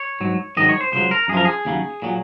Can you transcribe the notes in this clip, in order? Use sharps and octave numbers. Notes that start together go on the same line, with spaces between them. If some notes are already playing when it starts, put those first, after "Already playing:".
Already playing: C#5
G#2 F#3
G#2 D#3 F#3 D#5
C#5
C5
C#2 C#3 F#3 C5
A#4
F#2 G#4
F3 A#4
G#4
D#2 C#3 F#3
A#2 F#3